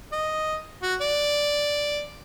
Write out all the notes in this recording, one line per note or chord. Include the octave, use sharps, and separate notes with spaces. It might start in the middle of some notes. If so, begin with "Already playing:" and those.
D#5
F#4
D5